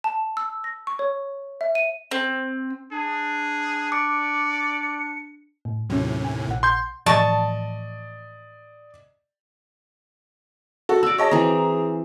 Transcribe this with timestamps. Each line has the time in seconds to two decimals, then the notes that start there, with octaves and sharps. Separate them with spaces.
0.04 A5
0.37 E6
0.64 A#6
0.87 C#6
0.99 C#5
1.61 E5
1.75 D#7
2.11 C4
2.92 D4 G#4
3.92 D5 D6 C#7
5.65 A2
5.90 D#2 A2 C3 F#3 C#4
6.25 G#5
6.48 A#1 F#5
6.63 C6 G6
7.06 A2 E3 F3 D5 D#5 A5 C#6
10.89 F#4 A4
11.03 F#4 D5 E6 D7
11.18 G#4 C#5 D#5 A5
11.31 E3 C4 A#5